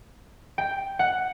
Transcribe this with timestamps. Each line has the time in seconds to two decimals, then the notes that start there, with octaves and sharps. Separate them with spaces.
0.58 G5
0.99 F#5